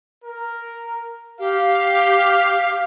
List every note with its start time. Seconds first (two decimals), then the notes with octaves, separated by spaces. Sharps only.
0.23 A#4
1.39 G4 F5